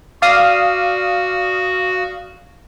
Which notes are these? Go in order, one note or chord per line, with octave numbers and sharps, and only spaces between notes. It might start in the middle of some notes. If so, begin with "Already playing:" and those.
F#4 D5 F5 D#6